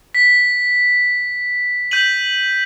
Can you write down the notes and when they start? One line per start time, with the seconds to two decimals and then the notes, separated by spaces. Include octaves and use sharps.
0.15 B6
1.91 G6 B6 D#7 F#7